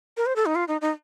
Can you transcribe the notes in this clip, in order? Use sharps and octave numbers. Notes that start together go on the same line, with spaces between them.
A#4
C5
A4
D#4
F4
D#4
D#4